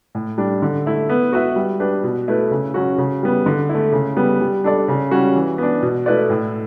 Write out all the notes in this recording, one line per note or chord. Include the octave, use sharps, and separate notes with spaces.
A2
G3 D4
D3
A3 E4
B3
F#4 B4 E5
G3
D4 G4 B4
B2
A3 E4 B4
C#3
F#3 C#4 F#4
C#3
G3 B3
D3
E4
A3
C#3
G3 B3
G3
D4 A4 D5
C#3
G3 C#4 F#4
E3
B3 D4
B2
A3 E4 B4 D5
A2